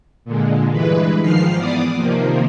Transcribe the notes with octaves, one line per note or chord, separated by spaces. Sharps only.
A#2 D3 G#3
G2 E3 G#3 B4
G#2 D#3 F3 F6 C7
E3 B3 D5 D6 D#6
C3 D#3 F3 A#3